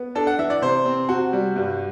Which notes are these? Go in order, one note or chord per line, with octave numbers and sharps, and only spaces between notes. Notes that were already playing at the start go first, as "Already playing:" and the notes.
Already playing: B3
D4 A4
F#5
E3 E5
D5
C3 C5
C4
C3 F#4
G3
G2